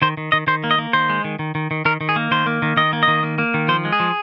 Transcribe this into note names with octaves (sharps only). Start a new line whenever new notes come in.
D#3 C5
D#3
D#3 D#5
D#3 C5
A#3
D#5
A#3
D#3 C5
G#3
D#3
D#3
D#3
D#3
D#3 A#4
D#3
G#4
A#3
D#3 C5
A#3
D#3
D#3 D#5
A#3
D#5
D#3
A#3
A#3
D#3
F3 C5
G#3
G#4
F3